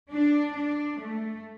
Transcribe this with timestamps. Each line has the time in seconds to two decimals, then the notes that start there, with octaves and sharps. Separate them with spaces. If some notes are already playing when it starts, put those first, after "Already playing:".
0.12 D4
0.55 D4
0.99 A3